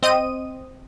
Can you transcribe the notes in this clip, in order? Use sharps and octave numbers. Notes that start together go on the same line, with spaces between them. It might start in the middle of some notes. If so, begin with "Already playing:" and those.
C4 D#5 D#7